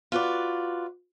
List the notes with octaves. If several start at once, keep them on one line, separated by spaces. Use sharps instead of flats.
F4 F#4 B4 D5